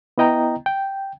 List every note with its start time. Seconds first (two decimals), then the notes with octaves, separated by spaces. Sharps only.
0.18 B3 E4 D#5 G5 A#5
0.66 G5